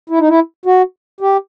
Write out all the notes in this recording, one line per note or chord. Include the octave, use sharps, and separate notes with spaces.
E4
D#4
E4
F#4
G4